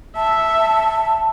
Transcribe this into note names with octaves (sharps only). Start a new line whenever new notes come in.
E5 A5